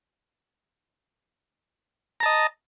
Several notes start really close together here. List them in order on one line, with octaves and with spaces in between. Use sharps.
A#5 A5 D#5